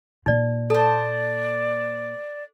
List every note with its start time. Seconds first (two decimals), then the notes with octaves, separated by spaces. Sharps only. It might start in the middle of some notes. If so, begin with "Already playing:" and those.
0.26 A#2 A#3 D#4 D5
0.70 A4 C5 D5 A5